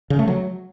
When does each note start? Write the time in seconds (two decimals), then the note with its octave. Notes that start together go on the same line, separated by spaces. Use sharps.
0.10 C#3
0.19 A3
0.28 F#3